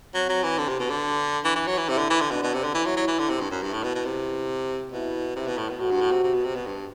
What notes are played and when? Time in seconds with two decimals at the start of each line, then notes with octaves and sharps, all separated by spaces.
0.14 F#3 C4
0.29 F#3
0.43 E3
0.58 D3
0.69 C3
0.79 B2
0.90 D3
1.01 D4
1.45 E3
1.56 E3
1.67 F#3
1.77 E3
1.88 C3 E4
1.98 D3
2.10 E3
2.20 D3
2.31 B2 D4
2.43 B2
2.54 C3
2.64 D3
2.74 E3 E4
2.86 F#3
2.97 F#3
3.08 E3
3.19 D3
3.30 C3
3.40 G2
3.51 F#2
3.62 G2 E4
3.73 A2
3.83 B2
3.95 B2
4.05 C3
4.92 B2 E4
5.36 C3 E4
5.47 B2
5.57 A2
5.69 B2
5.79 A2 F#4
5.91 G2
6.01 A2
6.11 C3
6.23 C3
6.34 B2
6.44 C3
6.56 B2
6.66 G2